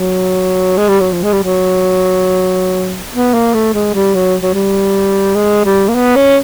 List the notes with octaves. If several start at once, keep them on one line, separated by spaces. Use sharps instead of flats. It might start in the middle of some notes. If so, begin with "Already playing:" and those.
Already playing: F#3
G#3
G3
F#3
F3
G#3
G3
F#3
B3
A#3
A3
G#3
G3
F#3
F#3
G3
G#3
G3
A#3
B3
C#4